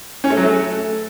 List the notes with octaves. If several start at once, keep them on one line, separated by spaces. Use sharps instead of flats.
C#4
A3
F#3
A3